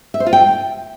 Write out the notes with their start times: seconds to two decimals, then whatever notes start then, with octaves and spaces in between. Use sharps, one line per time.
0.14 E5
0.20 C5
0.26 F4
0.33 G5